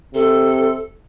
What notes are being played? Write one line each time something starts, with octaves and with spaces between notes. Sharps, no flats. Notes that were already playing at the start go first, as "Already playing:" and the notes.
C3 A4